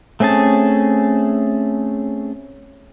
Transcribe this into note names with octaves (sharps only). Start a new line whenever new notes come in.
A3 C4 C#4 G#4 A5